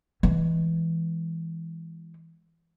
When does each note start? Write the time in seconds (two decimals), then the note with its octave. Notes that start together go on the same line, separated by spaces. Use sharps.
0.23 E3 G#3